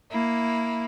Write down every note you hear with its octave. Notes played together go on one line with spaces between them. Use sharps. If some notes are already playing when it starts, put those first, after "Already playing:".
A#3 E4